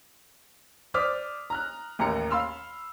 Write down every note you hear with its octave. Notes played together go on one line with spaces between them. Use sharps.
C5 D5 D6 D#6 F6 B6
A#5 F6 F#6
A1 D#2 A#4 A#5 C#7
F5 B5 C6 E6 F6